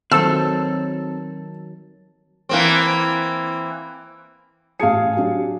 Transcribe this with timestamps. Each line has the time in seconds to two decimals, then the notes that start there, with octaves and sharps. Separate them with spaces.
0.12 D#3 F#3 C4 A4 A5 E6
2.49 E3 A#3 C4
4.80 A1 G#4 F5 A5 C#7
5.17 F#3 D4 G4